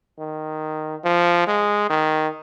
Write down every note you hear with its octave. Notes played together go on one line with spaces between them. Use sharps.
D#3
F3
G#3
D#3